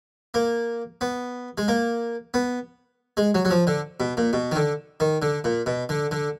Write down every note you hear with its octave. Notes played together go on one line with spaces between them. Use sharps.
A#3
B3
G#3
A#3
B3
G#3
F#3
F#3
F3
D3
B2
A#2
B2
D#3
D3
D#3
D3
A#2
B2
D3
D3